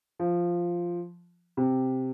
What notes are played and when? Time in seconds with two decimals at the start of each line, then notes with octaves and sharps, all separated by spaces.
0.19 F3
1.57 C3